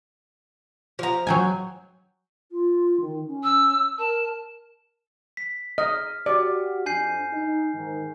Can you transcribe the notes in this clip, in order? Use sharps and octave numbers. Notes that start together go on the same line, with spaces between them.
F3 A#5
F#3 G5 G#5
F4
D#3
C#4
E6
A#4 A5
B6
D#5 F6
F#4 G4 D5
F2 D4 G#5 G6 C7
D#4
G#2 D#3